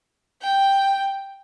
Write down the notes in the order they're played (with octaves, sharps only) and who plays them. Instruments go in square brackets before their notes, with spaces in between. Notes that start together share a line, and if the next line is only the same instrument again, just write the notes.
[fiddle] G5